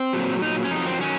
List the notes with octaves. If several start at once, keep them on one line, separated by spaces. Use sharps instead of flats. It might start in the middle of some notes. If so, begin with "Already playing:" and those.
Already playing: C4
A#2 F#3
A#2 F#3 D#4
C#4
F2 D#3 F#3 D#4
C4
D#3 F#3 C#4